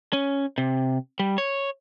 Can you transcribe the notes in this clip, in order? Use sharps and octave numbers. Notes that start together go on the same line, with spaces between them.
C#4
C3
G3
C#5